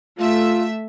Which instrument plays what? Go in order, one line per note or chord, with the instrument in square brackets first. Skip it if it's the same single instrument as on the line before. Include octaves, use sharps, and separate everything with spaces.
[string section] A3 E5 [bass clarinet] F4